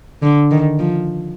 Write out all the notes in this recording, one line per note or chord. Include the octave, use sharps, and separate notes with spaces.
D3
D#3
F3